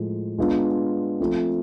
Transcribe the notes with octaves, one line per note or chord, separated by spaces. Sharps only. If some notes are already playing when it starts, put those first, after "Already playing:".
Already playing: A2 F3 G#3
G#3 B3 D4 F4
F3 A3 C4 F4